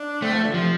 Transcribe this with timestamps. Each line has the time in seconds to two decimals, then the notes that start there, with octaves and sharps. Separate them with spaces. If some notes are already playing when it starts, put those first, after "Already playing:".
Already playing: D4
0.22 A3 C4
0.34 F3
0.44 D3
0.54 C3 F3